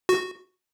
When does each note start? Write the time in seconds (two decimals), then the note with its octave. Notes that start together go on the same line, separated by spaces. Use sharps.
0.09 F#4